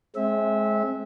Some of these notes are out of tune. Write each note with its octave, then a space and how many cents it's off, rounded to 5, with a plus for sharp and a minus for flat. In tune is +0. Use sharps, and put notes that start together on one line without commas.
G#3 +20 C4 +30 E5 -20